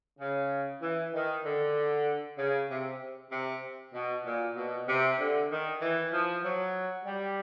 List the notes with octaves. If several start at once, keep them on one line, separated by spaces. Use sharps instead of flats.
C#3
E3
D#3
D3
C#3
C3
C3
B2
A#2
B2
C3
D3
D#3
E3
F3
F#3
G3